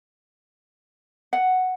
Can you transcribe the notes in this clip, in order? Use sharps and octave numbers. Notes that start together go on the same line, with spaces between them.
F#5